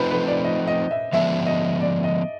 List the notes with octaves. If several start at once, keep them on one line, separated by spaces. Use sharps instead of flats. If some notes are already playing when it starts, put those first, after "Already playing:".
Already playing: F3 A3 C4 D#4 B4 C5
B4
D5
D#5
D#5
E5
D3 F3 G#3 B3 D4 E5
D#5
D5
D#5